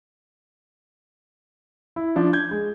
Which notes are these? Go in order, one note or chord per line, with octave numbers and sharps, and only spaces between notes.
E4
F3 D4
G6 G#6
G#3